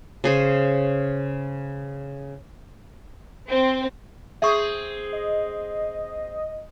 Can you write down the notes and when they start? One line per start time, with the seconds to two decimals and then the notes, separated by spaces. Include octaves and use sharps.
0.24 C#3 G#4 C5
3.50 C4
4.42 C4 G#4 E5 C#6
5.13 D#5